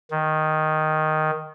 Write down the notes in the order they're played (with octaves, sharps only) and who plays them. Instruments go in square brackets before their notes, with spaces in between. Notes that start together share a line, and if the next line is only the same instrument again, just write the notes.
[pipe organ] D#3